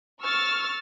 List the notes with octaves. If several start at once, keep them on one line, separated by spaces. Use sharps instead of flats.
C#6 E6 F6 A6